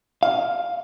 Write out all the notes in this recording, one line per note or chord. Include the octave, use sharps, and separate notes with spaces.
F5